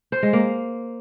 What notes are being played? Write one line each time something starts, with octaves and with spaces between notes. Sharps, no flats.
C5
G#3
A#3